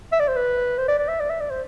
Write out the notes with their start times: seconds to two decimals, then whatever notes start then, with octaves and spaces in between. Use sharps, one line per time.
0.12 E5
0.20 D5
0.28 C5
0.36 B4
0.78 C5
0.88 D5
0.99 D5
1.08 E5
1.20 D5
1.30 E5
1.41 D5
1.50 C5